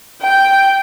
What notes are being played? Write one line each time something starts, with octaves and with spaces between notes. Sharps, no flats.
G5